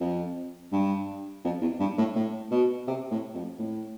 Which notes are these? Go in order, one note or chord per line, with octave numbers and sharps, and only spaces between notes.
F2
G2
F2
E2
G2
A2
A2
B2
C3
A2
F2
A2